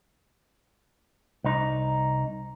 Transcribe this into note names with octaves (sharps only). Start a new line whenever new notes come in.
C2 D#4